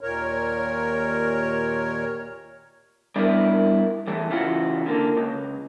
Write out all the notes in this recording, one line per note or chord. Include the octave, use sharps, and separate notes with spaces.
D#2 A#2 A#4 C#5
G3 B3 D4 E4 A#4
E2 E3 A3
C#3 E3 F4 F#4
D3 A#3
C#2